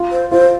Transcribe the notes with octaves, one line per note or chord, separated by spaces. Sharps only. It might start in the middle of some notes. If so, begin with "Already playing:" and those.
Already playing: F4
C5
F4 C5